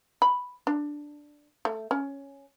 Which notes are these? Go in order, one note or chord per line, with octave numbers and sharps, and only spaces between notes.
B5
D4
A3
C#4